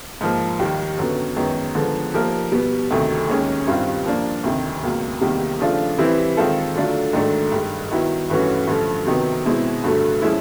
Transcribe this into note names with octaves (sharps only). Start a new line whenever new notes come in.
G#2 F3 A#3
D#2 D#3 G3 A#3
F#2 D3 F#3 B3
F#2 D#3 G#3 B3
D3 F3 G#3 B3
F3 A#3 D#4 G4 A#4
B2 G3 B3
D2 C3 D#3 F#3 A3
D#2 D#3 G#3 C#4
G2 D#3 G3 C4 F4
F3 A#3 D4
D2 C3 D#3
C#2 B2 F#3 A#3
E2 C3 D#3 G3 A#3
C#3 F3 A3 D4 F4
E3 G3 C4 E4
D#3 G#3 C4 F4 A4
D3 F#3 A3 D4 F4
G#2 D#3 F#3 A3 D4
G2 D#3 G#3
D#3 F#3 B3 E4
G2 E3 A3 C#4 F#4
G2 D3 F3 A3
C3 D#3 F#3 B3
B2 G#3 C4 E4
G2 D3 F#3 A3
F3 G#3 C#4 E4